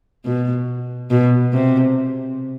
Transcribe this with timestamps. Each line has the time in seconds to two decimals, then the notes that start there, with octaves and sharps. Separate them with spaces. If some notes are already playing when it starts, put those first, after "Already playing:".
0.25 B2
1.11 B2
1.53 C3